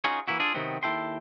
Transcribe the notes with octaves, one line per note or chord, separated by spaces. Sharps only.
C#4 D#4 F4 F#4 G#4 C#5
E3 A#3 E4 F#4
D4 F4 G#4 A4 D5
C3 D#3 F#3 B3 C4
D#2 E4 A4 G5 C6